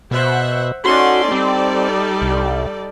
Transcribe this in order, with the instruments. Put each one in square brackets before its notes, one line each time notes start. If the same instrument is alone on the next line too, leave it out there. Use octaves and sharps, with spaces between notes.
[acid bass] B2 [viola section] C5 E5 F#5
[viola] C#4 C6 [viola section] D#4 A4 D5 [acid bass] F#4
[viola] G3 [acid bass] C4
[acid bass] C2